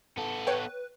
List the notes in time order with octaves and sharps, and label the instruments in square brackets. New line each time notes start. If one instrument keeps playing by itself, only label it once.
[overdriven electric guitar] B3 A4
[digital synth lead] B4 [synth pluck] C#5 G5